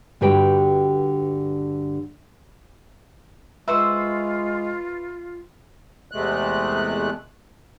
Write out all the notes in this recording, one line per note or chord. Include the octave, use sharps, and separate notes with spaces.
G2 D3 F#4 G4 B4 G5
G#3 F4 B4 C5 E5 C#6 E6
E2 C3 G#3 A3 F#6